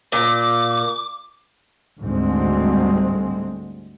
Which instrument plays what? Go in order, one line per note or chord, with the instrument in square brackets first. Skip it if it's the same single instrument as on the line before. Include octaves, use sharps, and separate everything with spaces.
[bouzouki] A#2 [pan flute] D6
[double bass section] D2 G#2 D3 G3 G#3 C4